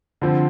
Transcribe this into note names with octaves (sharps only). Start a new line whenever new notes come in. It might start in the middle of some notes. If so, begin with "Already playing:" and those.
D3 F3 C4